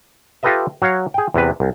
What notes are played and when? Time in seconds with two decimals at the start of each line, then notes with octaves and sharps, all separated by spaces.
0.43 F4 G4 A4 B4 D#5 E5
0.82 F#3 C#5 F5
1.14 G#4 G5
1.34 E2 C3 B4
1.60 C2